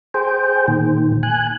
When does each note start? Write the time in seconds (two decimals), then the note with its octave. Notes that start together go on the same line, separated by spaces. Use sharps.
0.14 G#4 C5 G5
0.68 A#2 D#3
1.23 G#5 F#6